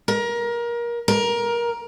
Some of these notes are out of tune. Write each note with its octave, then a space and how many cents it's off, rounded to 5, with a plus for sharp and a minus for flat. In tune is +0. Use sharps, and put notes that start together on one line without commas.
A#4 +25
A#4 +20